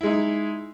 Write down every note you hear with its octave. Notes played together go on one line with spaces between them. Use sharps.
G#3 D#4 E4